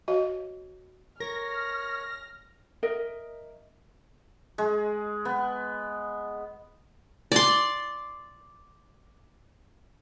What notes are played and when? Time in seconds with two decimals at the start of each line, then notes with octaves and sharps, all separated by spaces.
0.08 F#4 C#5 D#5 F5
1.20 A#4 C#5 F6 A#6
2.83 A#4 D#5 E5
4.58 G#3
5.25 B3
7.32 D5 C6